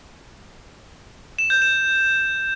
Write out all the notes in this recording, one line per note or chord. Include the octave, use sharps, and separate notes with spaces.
E7
G6
E7